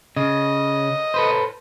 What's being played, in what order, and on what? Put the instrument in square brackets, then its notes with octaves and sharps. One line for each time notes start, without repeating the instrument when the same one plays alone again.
[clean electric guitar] C#3 [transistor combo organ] D#5
[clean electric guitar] A4 B4 C5